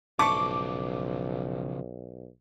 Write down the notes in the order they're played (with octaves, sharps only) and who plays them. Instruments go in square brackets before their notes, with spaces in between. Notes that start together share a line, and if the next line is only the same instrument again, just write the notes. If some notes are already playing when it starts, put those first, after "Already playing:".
[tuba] B1 [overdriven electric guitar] C#3 F3 [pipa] A3 D4 C#6 [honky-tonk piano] D6